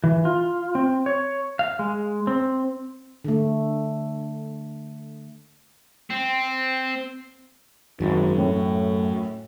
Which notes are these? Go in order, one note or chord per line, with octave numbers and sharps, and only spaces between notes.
E3
F4
C4
C#5
F5
G#3
C4
D3 A3
C4
G#1 F#2
A2 A3